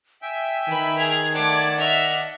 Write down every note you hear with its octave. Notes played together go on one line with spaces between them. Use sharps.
E5 G5 G#5
D#3 B4 B5
G#4 F6 G#6
A3 D5 F#5 A5 D6
D#5 E5 F6